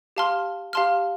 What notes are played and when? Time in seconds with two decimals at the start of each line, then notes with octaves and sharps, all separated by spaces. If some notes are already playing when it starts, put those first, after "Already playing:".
0.17 G4 F5 A5 C6 F6
0.73 G4 F5 A5 C6 F6